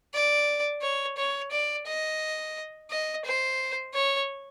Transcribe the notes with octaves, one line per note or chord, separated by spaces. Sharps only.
D5
C#5
C#5
D5
D#5
D#5
C5
C#5